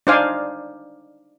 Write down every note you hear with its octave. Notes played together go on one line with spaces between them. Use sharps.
D4 D#4 C5 D5 F5 G#5